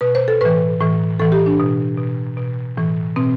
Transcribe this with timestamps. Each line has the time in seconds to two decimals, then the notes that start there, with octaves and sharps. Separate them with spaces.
0.01 B2 B4
0.15 C5
0.28 A4
0.41 A2 E3 B4
0.80 A2 E3
1.19 A2 E3 A4
1.32 G4
1.46 D4
1.59 B2
1.97 B2
2.37 B2
2.77 A2 E3
3.16 B2 C4